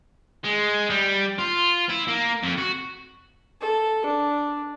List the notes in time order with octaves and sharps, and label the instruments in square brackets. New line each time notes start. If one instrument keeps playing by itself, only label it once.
[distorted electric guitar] G#3
G3
F4
E4
A#3
F2
F#4
[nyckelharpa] A4
D4